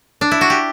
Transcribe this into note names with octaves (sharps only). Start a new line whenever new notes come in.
D4
E4
F#4
G4